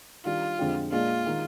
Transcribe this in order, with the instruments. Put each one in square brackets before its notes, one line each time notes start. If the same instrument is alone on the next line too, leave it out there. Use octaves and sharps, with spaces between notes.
[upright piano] D#3 G3 D4 G4 [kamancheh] F4
[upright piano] F2 D3 G#3 C4 G4
[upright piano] A#2 G#3 D4 [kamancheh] F4
[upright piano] D#3 G#3